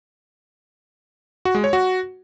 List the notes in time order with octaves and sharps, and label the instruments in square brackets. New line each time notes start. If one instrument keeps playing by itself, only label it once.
[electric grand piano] F#4
G#3
C#5
F#4